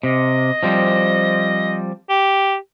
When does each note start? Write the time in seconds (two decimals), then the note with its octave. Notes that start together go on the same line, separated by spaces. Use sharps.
0.03 C3 D#5
0.63 F3 G3 C4
2.10 G4